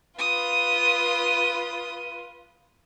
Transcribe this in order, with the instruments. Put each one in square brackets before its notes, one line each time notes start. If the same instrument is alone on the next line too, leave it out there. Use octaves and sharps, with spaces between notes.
[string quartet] F4 B4 [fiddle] D#6